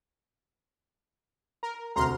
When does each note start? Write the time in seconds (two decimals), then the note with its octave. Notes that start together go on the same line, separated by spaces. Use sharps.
1.63 A#4
1.96 D2 C3 A#5 C6 F6